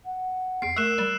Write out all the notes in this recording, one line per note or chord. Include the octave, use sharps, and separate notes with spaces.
F#5
E2 C7 D7
A3 A#4 E6 F#6 E7
G3